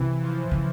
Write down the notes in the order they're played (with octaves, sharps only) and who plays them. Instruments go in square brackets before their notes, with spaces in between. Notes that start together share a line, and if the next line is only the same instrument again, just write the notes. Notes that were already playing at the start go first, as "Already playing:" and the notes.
Already playing: [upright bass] C3 [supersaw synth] E3
[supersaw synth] F3
[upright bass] C#3